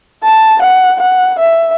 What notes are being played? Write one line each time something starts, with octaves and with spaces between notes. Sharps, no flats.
A5
F#5
F#5
E5